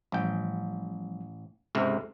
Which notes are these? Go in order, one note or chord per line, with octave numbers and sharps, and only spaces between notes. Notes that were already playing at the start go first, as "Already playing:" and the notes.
A1 F3 G3 G5
C#2 G#2 C3 A4